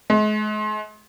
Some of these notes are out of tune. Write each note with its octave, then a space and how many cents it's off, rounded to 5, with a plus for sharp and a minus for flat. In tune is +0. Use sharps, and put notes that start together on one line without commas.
G#3 +40